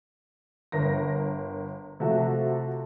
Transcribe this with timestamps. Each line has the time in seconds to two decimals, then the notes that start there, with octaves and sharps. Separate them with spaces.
0.72 G1 A#4 A#6
2.00 C3 F3 A3 F#4 A4